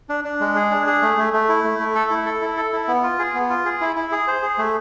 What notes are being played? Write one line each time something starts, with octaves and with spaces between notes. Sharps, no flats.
D4
D4
G#3
G#4
D4
G#4
A3
A3
A3
E4
A3
A3
A4
E4
A4
E4
A4
E4
B3
F4
G#4
B3
F4
G#4
E4
E4
G#4
C5
G#4
A3